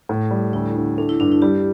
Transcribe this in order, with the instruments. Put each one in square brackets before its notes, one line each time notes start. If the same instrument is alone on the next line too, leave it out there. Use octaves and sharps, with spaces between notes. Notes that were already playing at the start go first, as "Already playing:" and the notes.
[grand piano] A2
G3
[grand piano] D2 [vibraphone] E4
[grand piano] D3
[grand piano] A3 [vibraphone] D4
[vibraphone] E4
[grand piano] G2 [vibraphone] D4
[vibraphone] E4
[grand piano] G3 [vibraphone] G4